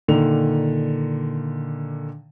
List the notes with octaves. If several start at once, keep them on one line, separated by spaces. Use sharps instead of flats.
A#2 D3 D#3 F7